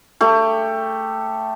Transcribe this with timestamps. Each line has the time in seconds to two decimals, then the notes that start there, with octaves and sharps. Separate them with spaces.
0.21 A3 G4